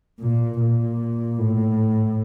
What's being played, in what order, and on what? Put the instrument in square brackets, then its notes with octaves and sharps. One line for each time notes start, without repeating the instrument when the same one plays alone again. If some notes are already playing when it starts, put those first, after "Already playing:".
[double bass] A#2
A#2
A2